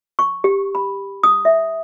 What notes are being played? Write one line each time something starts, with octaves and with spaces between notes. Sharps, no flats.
C#6
G4
B5
D#6
E5